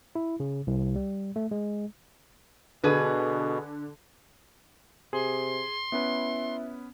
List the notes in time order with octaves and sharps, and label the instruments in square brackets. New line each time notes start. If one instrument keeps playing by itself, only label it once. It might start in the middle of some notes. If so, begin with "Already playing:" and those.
[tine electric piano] E4
C#3
C2
G3
A3
G#3
[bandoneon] B2 [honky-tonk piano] D3 [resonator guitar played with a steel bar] G#4 B4
[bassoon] C3 [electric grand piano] G#4 [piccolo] C6
[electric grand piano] B3 C#4 B4 [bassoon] E4